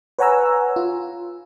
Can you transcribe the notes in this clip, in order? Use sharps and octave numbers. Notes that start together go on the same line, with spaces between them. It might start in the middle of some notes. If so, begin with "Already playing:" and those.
B4 C#5 F#5 G#5 A#5 E6
F4